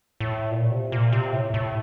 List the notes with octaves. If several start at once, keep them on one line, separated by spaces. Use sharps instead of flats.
A2
A#2
C3
A#2
C3
A2
A2